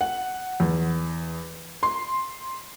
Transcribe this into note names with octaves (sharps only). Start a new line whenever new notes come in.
F#5
E2
C6